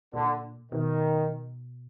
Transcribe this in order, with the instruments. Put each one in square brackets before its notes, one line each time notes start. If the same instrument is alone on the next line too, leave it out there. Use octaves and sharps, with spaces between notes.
[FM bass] A#2 [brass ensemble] D3
[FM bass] B2 [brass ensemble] D#3